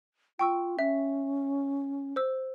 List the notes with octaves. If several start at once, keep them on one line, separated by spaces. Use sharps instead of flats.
F4 G5 C#6 E6
C#4 E5
C5 E6